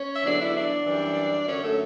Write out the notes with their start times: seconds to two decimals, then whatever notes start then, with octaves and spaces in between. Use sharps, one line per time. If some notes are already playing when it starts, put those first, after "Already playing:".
Already playing: C#4 C#5
0.14 E5
0.25 E2 D3 F#3 D4 D5
0.40 E4 E5
0.55 D4 D5
0.86 F#2 E3 G3
1.47 F#2 D3 F#3 C#4 C#5
1.63 A3 A4